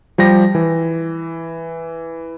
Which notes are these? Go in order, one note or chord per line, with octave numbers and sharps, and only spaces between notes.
F3 G3 G4 A#6
E3